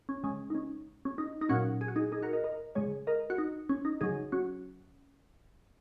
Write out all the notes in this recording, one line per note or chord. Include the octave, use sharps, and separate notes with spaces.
C#4
C#3 G#3 C#4
D#4
C#4
C#4
D#4
D#4
A#2 F#3 C#4 F#4
G#4
F#4
D#4 G#4
D#4 G#4
F#4 A#4
A#4 D#5
A#4 D#5
C#3 G#3 G#4 C#5
A#4 D#5
F#4
D#4
C#4
D#4
C#3 F#3 D#4 G#4
C#4 F#4